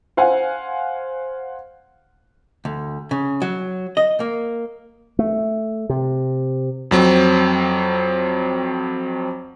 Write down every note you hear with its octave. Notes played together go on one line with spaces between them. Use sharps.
C5 F5 F#5 G#5
D2
C#3
F#3
D#5
A#3
A3
C3
F2 F#3 C4